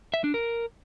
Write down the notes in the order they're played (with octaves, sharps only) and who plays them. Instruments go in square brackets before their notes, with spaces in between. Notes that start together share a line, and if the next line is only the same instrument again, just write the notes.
[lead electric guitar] E5
D4
A#4